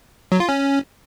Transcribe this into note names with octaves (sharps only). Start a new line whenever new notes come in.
F#3
F4
C#4